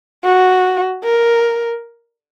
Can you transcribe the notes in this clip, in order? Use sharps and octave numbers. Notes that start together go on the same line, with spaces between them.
F#4
A#4